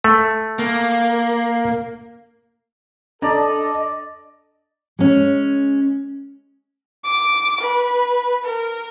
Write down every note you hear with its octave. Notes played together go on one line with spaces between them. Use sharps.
A3
A#3
D4 A4 D5 D#5 A#5
G#3 C#4
D6
B4
A#4